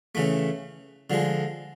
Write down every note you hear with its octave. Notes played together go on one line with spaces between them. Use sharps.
C#3 E3 A3
D3 F3 G#3